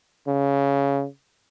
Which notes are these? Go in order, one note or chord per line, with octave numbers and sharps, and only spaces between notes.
C#3